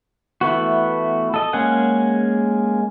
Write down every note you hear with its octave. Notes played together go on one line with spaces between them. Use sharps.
E3 A3 B3 F#4
A4 D#5
G#3 A#3 C#4 G#4 F#5